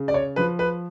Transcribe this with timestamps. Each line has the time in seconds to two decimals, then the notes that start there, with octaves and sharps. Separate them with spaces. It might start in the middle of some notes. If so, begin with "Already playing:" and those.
Already playing: C#3
0.08 D5
0.14 C#5
0.36 F3 B4
0.59 B4